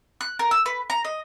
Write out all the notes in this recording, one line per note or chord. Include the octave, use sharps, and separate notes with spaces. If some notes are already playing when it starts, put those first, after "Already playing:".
F#6
A#4
E6
B4
A#5
D#5